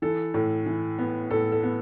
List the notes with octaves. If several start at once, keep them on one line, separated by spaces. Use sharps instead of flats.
E3 A4
A2
E3
B3
A2 A4
A4
B3